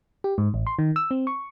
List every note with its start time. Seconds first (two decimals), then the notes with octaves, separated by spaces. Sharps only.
0.24 G4
0.38 G#2
0.54 A1
0.67 C6
0.79 D#3
0.96 E6
1.11 C4
1.27 C#6